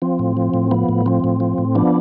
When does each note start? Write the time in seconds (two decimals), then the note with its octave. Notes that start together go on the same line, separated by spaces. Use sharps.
0.02 F3 C4
0.19 A2
0.37 F3
0.54 A2
0.71 F3 B3
0.89 A2
1.06 F3 C4
1.24 A2
1.40 F3
1.58 A2
1.75 F3 B3 D4